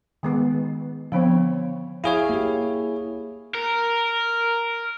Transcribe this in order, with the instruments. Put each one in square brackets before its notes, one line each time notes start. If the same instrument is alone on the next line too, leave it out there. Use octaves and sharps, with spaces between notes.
[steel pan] D#3 G#3 B3
[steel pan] D3 C4 C#5 [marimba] F3 B3
[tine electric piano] E4 G#4 C#5 [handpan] F5
[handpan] A#3 G4
[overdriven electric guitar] A#4